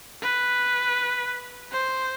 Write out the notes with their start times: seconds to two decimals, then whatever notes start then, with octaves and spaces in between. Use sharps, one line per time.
0.23 B4
1.72 C5